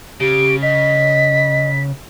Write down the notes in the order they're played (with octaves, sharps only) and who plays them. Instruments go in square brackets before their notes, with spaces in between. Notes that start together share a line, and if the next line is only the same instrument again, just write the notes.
[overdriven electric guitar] C#3 [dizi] G4 [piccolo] D7
[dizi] D#5 [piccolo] B6